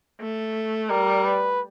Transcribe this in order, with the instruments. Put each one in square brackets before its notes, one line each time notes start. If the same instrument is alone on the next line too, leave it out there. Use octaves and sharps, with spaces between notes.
[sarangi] A3
[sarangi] G3 [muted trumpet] A#4
[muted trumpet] B4